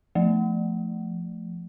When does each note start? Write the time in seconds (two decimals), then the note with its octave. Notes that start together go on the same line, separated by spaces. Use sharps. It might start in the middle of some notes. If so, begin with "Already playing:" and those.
0.15 F3 A3